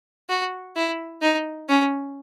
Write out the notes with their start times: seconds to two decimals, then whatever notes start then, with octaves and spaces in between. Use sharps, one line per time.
0.29 F#4
0.76 E4
1.22 D#4
1.69 C#4